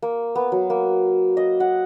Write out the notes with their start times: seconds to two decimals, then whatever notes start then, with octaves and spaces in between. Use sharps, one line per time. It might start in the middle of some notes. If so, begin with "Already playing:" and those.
0.02 A#3
0.35 B3
0.52 F#3
0.70 A#3
1.37 D#5
1.60 F#5